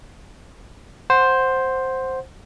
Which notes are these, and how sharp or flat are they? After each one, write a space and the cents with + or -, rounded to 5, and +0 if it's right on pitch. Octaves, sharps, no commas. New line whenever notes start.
C5 +5 F#5 +0